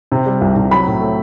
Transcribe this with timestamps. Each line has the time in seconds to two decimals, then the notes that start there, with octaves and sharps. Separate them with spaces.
0.12 C3
0.26 G3
0.41 C2
0.56 C3
0.71 F#3 B5
0.87 A2
1.01 A3